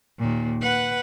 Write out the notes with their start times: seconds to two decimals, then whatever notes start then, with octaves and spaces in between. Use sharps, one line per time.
0.18 D#2 A#2
0.62 B4 F#5